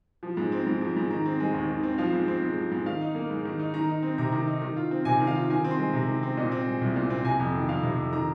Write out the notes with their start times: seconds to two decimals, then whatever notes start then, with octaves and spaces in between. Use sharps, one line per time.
0.23 F3
0.37 G#2
0.52 C4
0.67 G#2
0.81 F3
0.96 G#2
1.10 D#3 A#5
1.26 C4
1.40 G#3
1.54 D#2
1.69 D#3
1.83 C4
1.98 F3 F5
2.13 G#2
2.28 C4
2.42 G#2
2.57 F3
2.71 G#2
2.86 D#3 F5
3.01 D#4
3.15 A#3
3.30 G#2
3.45 D#3
3.59 D#4
3.74 D#3 A#5
3.88 D#4
4.03 C4
4.18 C3 A#5
4.32 D#3
4.47 D#4
4.62 D#3
4.77 F4
4.91 C4
5.05 C3 G#5
5.20 D#3
5.27 F5
5.34 F4
5.50 D#3 G#5
5.64 C4
5.71 C6
5.79 G#3
5.93 C3
6.08 D#3
6.23 C4
6.37 A#2 D#5
6.52 C4
6.66 G#3
6.81 C2
6.96 A#2
7.10 C4
7.25 C3 G#5
7.40 F2
7.55 D#3
7.69 F2 F5
7.83 C3
7.98 F2
8.13 D#3 A#5